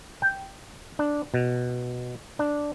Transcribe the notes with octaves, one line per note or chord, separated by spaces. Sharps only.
G5
D4
B2
D4